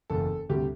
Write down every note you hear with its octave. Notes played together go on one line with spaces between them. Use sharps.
F#1 E2 B2 A4
D2 C3 G3 G4